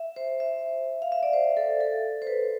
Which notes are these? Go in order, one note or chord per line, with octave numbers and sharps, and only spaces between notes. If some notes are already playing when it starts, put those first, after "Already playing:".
Already playing: E5
C5
E5
F5
E5
D5
C5
A4
A4
C5
B4